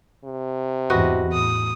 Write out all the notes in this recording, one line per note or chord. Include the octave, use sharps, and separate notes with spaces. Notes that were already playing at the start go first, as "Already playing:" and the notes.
C3
E2 G#2 F#4 B4 D#5
A2 D#6